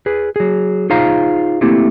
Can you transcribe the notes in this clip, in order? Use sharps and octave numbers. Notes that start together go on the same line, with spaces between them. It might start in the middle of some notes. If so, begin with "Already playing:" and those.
G#4 B4
F#3 G#4
D#4 F4 G#4 C5 F5 A#5
A3 A#3 C4 E4 G4